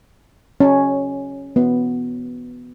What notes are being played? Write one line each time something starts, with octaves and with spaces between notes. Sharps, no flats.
C#4
B3